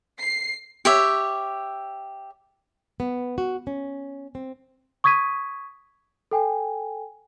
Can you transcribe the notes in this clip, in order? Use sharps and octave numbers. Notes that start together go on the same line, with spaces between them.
C7
G4 C#5 E5
B3
F#4
C#4
C4
C#6 D#6 G#6 B6 D#7
A4 G5 G#5